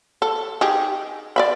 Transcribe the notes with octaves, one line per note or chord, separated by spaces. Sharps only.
A4
D#4 G4 G#4
D5 E5 B5